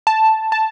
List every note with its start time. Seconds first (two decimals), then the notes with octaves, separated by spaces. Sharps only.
0.07 A5
0.52 A5